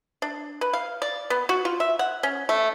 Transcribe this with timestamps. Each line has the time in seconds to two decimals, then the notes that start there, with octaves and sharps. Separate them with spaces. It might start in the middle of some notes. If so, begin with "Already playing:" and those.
0.22 D4
0.61 B4
0.73 F5
1.02 D5
1.30 B3
1.49 F#4
1.65 F4
1.80 E5
1.99 F#5
2.23 C#4
2.49 A3